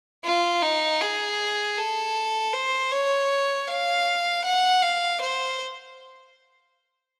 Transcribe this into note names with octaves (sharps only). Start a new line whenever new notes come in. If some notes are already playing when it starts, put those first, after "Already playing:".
F4
D#4
G#4
A4
C5
C#5
F5
F#5
F5
C5